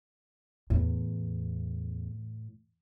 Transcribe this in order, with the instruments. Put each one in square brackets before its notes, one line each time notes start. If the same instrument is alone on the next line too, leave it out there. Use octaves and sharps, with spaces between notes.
[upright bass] E2 [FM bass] A2